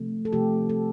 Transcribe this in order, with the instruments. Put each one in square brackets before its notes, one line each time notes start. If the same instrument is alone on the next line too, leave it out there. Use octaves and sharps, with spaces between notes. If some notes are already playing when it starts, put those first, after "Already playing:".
Already playing: [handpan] C3 F3 A3
A4
C3 F3 A3 G4
A4